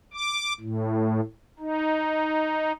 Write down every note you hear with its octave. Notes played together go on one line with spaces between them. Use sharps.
D6
A2
D#4